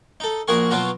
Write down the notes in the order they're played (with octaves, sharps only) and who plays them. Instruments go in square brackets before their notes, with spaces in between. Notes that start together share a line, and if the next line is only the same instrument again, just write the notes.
[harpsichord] D#4 A4
A#1 F#4 G#4 A#4 C#6
B2 F#3 F4 F#5 A#5